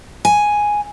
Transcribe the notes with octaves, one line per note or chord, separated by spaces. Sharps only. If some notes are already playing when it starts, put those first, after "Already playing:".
G#5